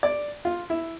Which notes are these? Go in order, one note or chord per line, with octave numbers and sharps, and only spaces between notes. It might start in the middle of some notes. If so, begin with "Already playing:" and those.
D5
F4
E4